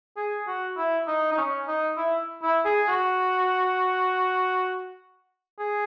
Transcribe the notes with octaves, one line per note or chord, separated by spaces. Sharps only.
G#4
F#4
E4
D#4
D#4
C#4
D#4
E4
E4
G#4
F#4
G#4